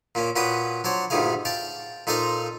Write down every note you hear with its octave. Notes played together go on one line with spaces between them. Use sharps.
A#2 A#3 C#4
A#2 C#4 F#4 B4 G5 D#6
F#3 D4 C5 C#5
D2 G2 A#2 D#3 G#4 F5
F5 G5 A5
A#2 D#4 A4 C5 F5 A#5